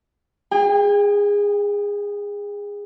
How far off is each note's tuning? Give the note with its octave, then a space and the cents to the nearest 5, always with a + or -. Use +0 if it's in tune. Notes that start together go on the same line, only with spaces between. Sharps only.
G#4 -20 G5 +35